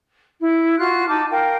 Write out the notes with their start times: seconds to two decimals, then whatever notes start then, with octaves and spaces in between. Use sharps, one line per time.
0.41 E4
0.78 F4 F#4 F#6
1.09 D#4 A5 B5 D6
1.32 A#4 F5 G5